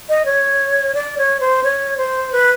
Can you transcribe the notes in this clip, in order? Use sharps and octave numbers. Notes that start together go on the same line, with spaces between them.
D#5
C#5
D5
C#5
C5
C#5
C5
B4